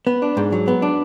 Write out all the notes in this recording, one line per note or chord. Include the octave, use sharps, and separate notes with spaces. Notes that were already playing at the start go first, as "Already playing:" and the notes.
B3
D4
G#2
F#3
B3
D4